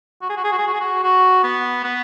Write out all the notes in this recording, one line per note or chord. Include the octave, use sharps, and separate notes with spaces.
F#4
G#4
F#4
G#4
F#4
G#4
F#4
G#4
F#4
F#4
B3
B3